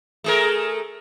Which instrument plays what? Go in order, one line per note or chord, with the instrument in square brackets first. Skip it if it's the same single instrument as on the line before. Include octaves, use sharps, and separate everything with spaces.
[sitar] A3 G#4 A#4